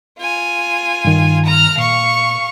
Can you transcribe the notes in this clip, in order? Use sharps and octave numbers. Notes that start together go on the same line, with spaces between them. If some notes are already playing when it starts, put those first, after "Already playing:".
F4 G#5
G2 D#3
A#5 F6
A#2 F5 C#6